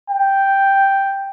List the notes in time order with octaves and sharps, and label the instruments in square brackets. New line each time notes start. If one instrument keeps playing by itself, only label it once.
[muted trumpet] G5